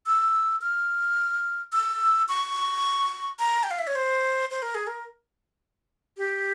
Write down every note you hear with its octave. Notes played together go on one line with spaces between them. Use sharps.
E6
F6
E6
C#6
A#5
G5
F5
E5
C#5
C5
C5
A#4
G#4
A#4
G4